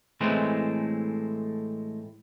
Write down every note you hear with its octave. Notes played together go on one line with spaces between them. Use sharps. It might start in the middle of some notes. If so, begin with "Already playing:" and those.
A2 E3 G#3 A3 C4